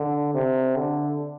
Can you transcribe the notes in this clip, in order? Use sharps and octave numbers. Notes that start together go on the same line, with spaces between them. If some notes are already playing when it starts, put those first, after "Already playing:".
Already playing: D3
C3
D3